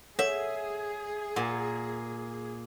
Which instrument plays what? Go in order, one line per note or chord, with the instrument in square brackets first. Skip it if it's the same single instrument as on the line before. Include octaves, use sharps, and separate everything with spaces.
[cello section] G#4 [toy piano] A4 C#5 F#5 [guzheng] E5
[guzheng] A#2 [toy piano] F#5